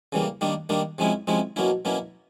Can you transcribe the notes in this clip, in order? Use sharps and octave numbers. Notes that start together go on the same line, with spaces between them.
C#3 E3 G3 A#3
D#3 G3 A#3 D4
D#3 G3 A#3 D4
C3 F3 G#3 C#4 E4
C3 F3 G#3 C#4 E4
B2 F#3 A#3 C#4 E4
B2 F#3 A#3 C#4 E4